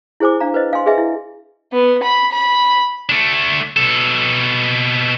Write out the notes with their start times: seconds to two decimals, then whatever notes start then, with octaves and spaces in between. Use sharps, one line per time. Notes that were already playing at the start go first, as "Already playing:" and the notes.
0.20 E4 G#4 C5 G#5 D6
0.40 D4 F5 A#5
0.54 B4 C5 D#5
0.73 F5 G#5 C6
0.86 G#4 B4 D#5 E5 G#5
0.98 E4
1.72 B3
2.03 B5
2.32 B5
3.09 A3 D4
3.77 B2 A4